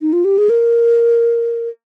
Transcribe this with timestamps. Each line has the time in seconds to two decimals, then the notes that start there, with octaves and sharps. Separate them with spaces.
0.00 D#4
0.13 F4
0.25 G4
0.38 G#4
0.49 A#4